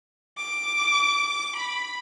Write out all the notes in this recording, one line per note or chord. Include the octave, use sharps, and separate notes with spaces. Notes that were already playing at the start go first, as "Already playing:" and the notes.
D6
B5